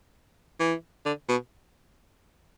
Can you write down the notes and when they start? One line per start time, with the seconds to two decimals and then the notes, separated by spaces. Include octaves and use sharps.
0.60 E3
1.05 D3
1.29 B2